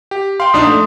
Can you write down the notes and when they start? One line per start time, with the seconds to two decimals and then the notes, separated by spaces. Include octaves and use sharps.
0.11 G4
0.40 F5 G5 C6
0.53 A#1 D4 D#4 D#6
0.67 A3